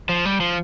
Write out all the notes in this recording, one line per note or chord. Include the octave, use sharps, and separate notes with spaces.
F3
G3
F3